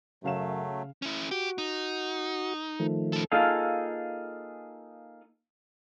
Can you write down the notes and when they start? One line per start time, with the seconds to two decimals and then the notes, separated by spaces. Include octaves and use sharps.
0.24 F#2 C#3 F#3 A3 F5 E7
1.02 C#4 E4
1.31 F#4 G4
1.58 D#4
2.80 D#3 F3 A3
3.13 C#4 A4
3.32 A#3 D#4 F4 G#4 A4 F5